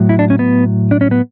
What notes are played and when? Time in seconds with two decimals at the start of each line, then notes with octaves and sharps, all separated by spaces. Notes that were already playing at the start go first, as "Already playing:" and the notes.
Already playing: A2 F#3
0.09 E4
0.19 D4
0.30 C#4
0.39 B3
0.91 D4
1.01 C#4
1.11 B3